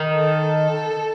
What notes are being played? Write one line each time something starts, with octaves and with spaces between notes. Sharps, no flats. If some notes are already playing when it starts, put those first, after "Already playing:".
Already playing: D#3
A4